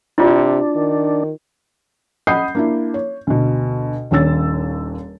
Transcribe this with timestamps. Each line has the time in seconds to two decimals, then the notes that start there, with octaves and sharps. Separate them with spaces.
0.18 C3 D4 E4 F4 D5
0.75 D#3
2.27 D#5 F#5 B5 D#6 G6 C7
2.55 A#3 D4 E4
2.94 C#5
3.27 D2 B2
4.11 D#1 D#2 D4 C#5 E6 A6